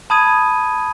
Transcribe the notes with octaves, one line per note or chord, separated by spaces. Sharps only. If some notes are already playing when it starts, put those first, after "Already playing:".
A5 B5 D#6 G#6 D#7